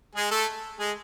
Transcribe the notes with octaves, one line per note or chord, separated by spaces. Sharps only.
G#3 G#4
A3 A4
G#3 G#4